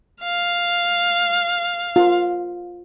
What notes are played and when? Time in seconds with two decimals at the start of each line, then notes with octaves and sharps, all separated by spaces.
0.23 F5
1.96 F4